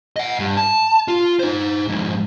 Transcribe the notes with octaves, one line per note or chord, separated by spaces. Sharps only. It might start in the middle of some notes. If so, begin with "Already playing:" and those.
D#5 F#5
G2
A5
F4
D#4 C5
F2 G#2